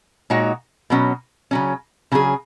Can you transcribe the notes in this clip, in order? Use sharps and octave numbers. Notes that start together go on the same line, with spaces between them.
A#2 G#3 D#4 F#4 C#5
B2 F#3 C#4
C#3 F#3 C#4
C#3 F#3 C#4 G#4